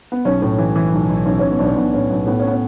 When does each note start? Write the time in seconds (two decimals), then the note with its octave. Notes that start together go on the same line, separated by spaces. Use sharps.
0.12 B3
0.25 B1 C#4
0.42 A2
0.59 E3
0.76 E3
0.93 B1
1.10 B1
1.26 B1 C#4
1.39 B1 C#4
1.51 B3
1.59 B1 D4
1.65 C#4
1.76 B1 B3
1.94 A2 C#4
2.10 B1 B3
2.27 A2 B3
2.40 C#4
2.47 B3
2.52 C#4